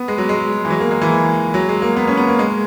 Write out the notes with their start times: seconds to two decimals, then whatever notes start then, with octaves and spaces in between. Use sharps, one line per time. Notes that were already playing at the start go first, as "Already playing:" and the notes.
Already playing: B3
0.08 G#3
0.18 F#3
0.29 G#3
0.65 E3
0.70 F#3
0.80 A#3
0.91 G#3
1.01 E3
1.54 F#3
1.69 G#3
1.82 A#3
1.96 B3
2.07 C#4
2.17 B3
2.28 A#3
2.39 G#3